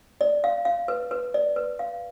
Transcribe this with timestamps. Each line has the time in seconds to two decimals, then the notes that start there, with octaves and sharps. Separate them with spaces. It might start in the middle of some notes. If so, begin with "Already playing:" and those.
0.21 D5
0.44 F5
0.65 F5
0.88 B4
1.11 B4
1.34 D5
1.56 B4
1.79 F5